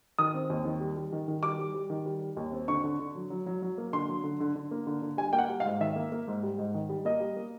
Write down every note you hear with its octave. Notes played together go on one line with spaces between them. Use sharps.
D#3 D#6
C4
D#2
D#3
G3
G3
D#3
D#3
G3 D6
G3
G3
D#3
G3
G3
D#2
C4
D3 C#6
D3
D3
F#3
F#3
F#3
F#3
A#3
D3 C6
F#3
D3
D3
D3
A#3
D3
D3
G3 G#5
A#3 G5
F#5
G3
F5
G#2
D#3 E5
A#3
A#3
G#2
G3
G#2
D#3
G3
A#3 D#5
G3
A#3